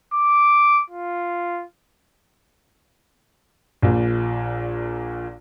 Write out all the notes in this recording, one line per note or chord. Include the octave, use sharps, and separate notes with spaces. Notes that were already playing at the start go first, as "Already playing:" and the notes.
D6
F4
A#1 A#2